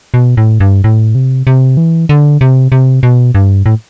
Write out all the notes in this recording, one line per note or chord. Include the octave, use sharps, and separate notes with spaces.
B2
A2
G2
A2
C3
C3
E3
D3
C3
C3
B2
G2
A2